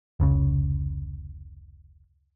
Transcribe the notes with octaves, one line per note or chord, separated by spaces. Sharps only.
F1 C#2 C#3